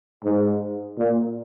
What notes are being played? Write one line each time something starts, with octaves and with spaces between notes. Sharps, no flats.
G#2
A#2